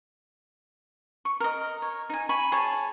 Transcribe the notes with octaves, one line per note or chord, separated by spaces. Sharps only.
C#6
A#4 D#5
C#5
D#4 G#5
G#5 B5 C#6
G#4 C#5 G#5 A5